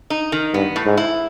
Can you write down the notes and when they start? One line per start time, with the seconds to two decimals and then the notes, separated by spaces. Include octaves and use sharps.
0.10 D#4
0.32 D#3
0.54 G2 B3
0.76 A2
0.86 G#2
0.97 E4